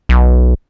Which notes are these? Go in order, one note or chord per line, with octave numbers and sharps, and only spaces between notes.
B1